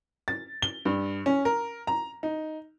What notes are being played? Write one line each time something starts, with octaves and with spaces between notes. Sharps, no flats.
A6
G7
G2
C#4
A#4
A#5
D#4